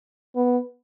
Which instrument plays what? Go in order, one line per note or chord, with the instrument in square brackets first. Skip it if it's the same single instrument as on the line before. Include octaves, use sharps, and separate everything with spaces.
[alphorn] B3